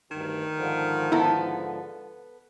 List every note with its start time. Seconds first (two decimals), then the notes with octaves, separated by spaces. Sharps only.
0.11 D2 G2 D#3
0.57 G#2 D3 F3
1.12 B3 E4 A4 A#5